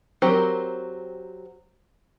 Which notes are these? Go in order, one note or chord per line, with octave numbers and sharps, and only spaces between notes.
F#3 C4 G4 A#4